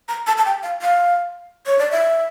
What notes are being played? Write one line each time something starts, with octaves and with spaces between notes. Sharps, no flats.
A#5
A5
A5
G5
F5
F5
C#5
D5
E5